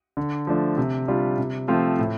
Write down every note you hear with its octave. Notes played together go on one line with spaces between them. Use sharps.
D3
F3 A3 D4
C3
G3 D4 F4
C3
F3 A3 C4 F4
A2